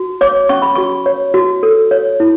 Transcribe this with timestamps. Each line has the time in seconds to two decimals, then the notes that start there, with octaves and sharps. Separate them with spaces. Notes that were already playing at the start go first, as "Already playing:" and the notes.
Already playing: F#4
0.21 C#5 D6
0.49 C#4 C#6
0.62 B5
0.75 F#4 C#6
1.06 C#5
1.34 F#4
1.63 A4
1.91 C#5
2.20 E4